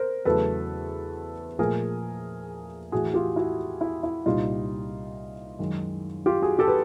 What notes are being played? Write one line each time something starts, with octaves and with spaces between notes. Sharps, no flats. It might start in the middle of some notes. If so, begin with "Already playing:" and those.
Already playing: A#4 C5
E2 C#3 F#3 A3 A4 B4
A#2 F3 A3 G#4 A#4
A2 E3 A3 F#4 G#4
F4 G4
E4 F#4
E4
E4
C2 A#2 G3 D#4 F4
F#2 D#3 G#3
F4 G4
F#4 G#4
G4 A4
B4